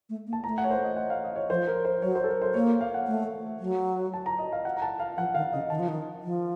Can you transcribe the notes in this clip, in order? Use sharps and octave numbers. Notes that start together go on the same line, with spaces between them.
A3
A#3
A5
A3 A#5
F#5
C#5
C5
D#5
F#5
F5
D#5
C#5
F3 C5
A#4
C5
F#3 C#5
C5
A4
A#4
C5
A#3 C#5
F5
F#5
A3
F#3
A5
A#5
D#5
F5
F#5
A#5
A5
F5
F3 F#5
D#3 F5
C#3 D#5
D#3 A5
F3
D#3
F3